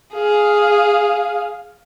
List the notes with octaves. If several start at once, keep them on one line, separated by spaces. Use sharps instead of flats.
G#4 F5